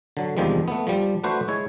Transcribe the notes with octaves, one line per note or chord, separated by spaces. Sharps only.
D3 F#3
E2 C3 D#3 F3 G3 G#3
A3 B3
F3 G3
A3 D4 F#4 B4 C5
G#3 E4 C#5